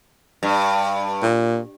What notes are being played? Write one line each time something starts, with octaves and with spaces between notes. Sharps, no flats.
G2
A#2